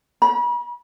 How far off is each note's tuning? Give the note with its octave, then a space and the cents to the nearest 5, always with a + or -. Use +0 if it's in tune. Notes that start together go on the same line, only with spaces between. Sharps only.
B5 -40